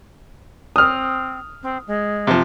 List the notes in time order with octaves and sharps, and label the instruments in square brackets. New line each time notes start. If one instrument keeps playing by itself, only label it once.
[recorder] C4 [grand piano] D#6 F6
[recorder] C4
G#3
[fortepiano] C3 F3